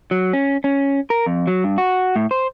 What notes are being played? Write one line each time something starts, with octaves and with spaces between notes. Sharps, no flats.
F#3
C#4
C#4
A#4
F2
F#3
G2
F#4
A2
C5